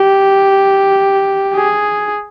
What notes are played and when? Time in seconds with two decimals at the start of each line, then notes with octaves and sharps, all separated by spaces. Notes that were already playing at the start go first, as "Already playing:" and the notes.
Already playing: G4
1.54 G#4